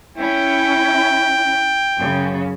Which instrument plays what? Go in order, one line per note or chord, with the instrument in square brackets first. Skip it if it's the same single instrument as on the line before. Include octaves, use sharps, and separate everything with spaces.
[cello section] C#4 E4 [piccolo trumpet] G5
[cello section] F#2 C#3